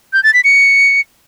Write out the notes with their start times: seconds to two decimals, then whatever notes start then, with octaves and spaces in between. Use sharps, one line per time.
0.13 G6
0.23 A6
0.34 B6
0.44 C#7